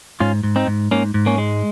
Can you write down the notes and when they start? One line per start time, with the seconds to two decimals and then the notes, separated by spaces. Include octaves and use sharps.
0.20 G#2 C#4 F4
0.44 G#2
0.56 C4 D#4
0.67 G#2
0.91 G#2 A#3 C#4
1.14 G#2
1.26 A#3 C#4
1.38 G#3